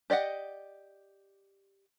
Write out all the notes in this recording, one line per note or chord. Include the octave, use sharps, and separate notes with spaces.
G4 D5 D#5 F#5